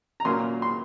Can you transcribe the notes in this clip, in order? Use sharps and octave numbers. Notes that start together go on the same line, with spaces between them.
A#5
A#2 F#3 A#3 C#4 C6
C6